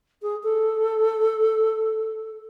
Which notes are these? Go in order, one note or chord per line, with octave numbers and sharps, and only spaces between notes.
G#4
A4